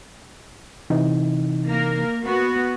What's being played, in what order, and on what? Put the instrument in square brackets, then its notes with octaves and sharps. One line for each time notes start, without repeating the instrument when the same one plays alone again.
[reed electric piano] C3 E3 D#4
[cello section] A#3 A#4
B3 F#4